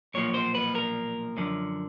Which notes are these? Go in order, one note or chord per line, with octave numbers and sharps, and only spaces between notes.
B1 A#2 F3 A#3 C#5
C5
B4
A#4
F#2 D3 F3